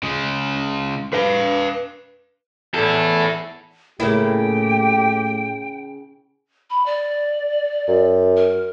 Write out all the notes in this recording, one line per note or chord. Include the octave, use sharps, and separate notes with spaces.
C#3 G#3
B4 F5
E2 E4 A4
A2 C#3 A#3 E4 G4 G5
B5
D5
F#2
A#4